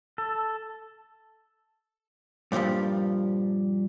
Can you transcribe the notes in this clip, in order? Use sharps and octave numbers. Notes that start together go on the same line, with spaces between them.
A4
G2 A#2 E3 F3 G3